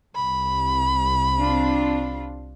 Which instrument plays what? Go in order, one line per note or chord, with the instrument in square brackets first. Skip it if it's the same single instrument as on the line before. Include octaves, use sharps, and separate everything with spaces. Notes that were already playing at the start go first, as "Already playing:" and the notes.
[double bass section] C2 [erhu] B5
[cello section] C4 D4 F4